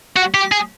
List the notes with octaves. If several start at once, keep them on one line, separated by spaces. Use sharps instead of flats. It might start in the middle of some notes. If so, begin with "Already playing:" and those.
F#4
G4
G#4